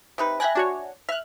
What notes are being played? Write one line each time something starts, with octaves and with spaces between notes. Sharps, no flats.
C3 D#4 B4
E5 G5 G#5 B5 F#6 A#6
D4 F#4 C#5
E5 F6 F#6